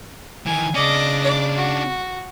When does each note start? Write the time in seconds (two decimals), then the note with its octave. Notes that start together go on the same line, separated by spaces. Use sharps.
0.46 D#3 E3 G#5
0.74 C#3 C#4 D4 D5 D#5
1.23 D5
1.55 F#4